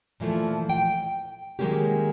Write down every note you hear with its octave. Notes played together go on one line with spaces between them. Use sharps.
A#2 E3 F3 A3
G5
D#3 F#3 G#3 A#3 C#4 G4